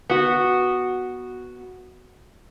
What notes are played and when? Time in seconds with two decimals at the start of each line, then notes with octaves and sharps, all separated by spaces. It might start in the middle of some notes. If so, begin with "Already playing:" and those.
0.09 B3 F#4